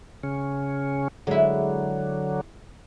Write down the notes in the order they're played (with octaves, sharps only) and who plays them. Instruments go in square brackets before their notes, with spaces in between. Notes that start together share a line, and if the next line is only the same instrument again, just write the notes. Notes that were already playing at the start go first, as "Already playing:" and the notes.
[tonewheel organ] C#3 C#4
[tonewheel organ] D3 F#3 [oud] G#3 E4